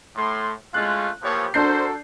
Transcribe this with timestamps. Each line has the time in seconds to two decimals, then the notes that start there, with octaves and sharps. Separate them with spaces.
0.16 A2 A3 C6
0.74 G#3 A3 C#4 F4 F#6
1.22 A2 E3 F3 A#3 G4 C#5
1.54 D4 F#4 A4 A#4 C5 G6 C7